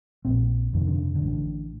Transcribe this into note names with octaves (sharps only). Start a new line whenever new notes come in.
A#1 A#2 C4
G1 F2 C3 D#3
D3
D3
A1 A2